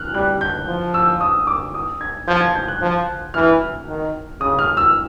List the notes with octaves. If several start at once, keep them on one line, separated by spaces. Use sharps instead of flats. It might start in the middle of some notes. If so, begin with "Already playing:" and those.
Already playing: F6 F#6
G3 F#6
G6
F3
E6
D#6
D6
D#6
G#6
F3 G6
G#6
G6
F#6
F3
E3 F6
D#3
C#3 D#6
F6
E6